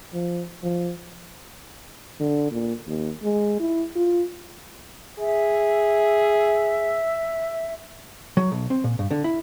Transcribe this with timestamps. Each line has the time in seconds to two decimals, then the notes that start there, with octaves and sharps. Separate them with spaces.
0.13 F3
0.63 F3
2.20 D3
2.51 A#2
2.87 D#2
3.23 G#3
3.60 E4
3.96 F4
5.19 G#4 E5
8.37 F#3
8.52 B1
8.70 C4
8.84 A#2
8.99 G2
9.11 D3
9.24 E4